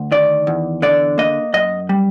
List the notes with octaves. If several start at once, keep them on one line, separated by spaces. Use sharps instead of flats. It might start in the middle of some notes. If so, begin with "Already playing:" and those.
Already playing: D2
D#3 D5
E2
D3 D5
A#3 D#5
F#2 D#5
G3